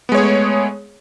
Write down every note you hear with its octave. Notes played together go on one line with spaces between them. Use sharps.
G#3 A3 B3 G#4 C#5